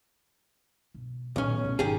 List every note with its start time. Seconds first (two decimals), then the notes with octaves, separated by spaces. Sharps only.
0.94 B2
1.36 B1 A#2 D#3 C#4
1.64 E2 A2
1.79 G#1 D#3 G4 G#4